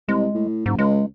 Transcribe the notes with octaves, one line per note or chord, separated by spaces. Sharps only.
C2 G#3
A2
F#1 G#2
C#2 G#3